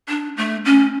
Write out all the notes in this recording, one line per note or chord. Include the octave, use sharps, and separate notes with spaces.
D4
A3
C#4